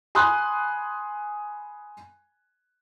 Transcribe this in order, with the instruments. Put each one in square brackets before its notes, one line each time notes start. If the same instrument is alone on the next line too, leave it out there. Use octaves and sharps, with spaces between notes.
[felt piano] G#5 B5 C6 D#6 F#6